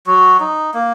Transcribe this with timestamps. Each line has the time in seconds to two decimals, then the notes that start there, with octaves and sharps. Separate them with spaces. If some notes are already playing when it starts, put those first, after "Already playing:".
0.07 F#3 F#4
0.40 D#4
0.74 A#3